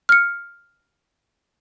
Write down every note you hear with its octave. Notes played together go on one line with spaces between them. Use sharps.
F6 C#7